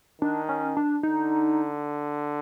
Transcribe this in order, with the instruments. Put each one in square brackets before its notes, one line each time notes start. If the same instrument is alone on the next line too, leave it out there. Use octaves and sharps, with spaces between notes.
[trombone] D#3 [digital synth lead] D4
[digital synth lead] C#4
D4
[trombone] D3 [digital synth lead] D#4